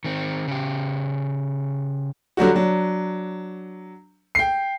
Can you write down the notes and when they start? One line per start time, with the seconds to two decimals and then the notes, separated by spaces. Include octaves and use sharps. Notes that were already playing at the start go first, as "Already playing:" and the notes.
0.04 D#3 C4
0.48 C#3 G4
2.37 D3 F#3 G3 F#4
2.54 F#3 D4
4.35 G5 C7